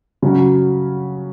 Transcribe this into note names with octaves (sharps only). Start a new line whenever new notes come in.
C#3 F#3 C#4 F#4